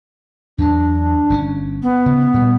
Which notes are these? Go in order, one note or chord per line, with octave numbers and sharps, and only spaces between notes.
E2 F#3 D4
G1 C3 C#4
B3
C#3
A#2 G3